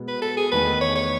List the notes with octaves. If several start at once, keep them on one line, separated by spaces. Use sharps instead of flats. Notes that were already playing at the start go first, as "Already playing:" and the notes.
Already playing: B2 G#3 B3
B4
A4
G#4
E2 D#3 A3 B4
C#5
C#5